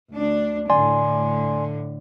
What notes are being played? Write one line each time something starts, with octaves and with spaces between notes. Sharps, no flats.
D2 D4
A2 D3 D5 G#5 C6